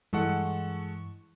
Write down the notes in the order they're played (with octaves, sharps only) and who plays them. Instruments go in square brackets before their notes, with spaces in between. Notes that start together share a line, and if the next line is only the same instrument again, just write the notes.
[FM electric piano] G2 E3 C#6 [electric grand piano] G#3 A4 F#5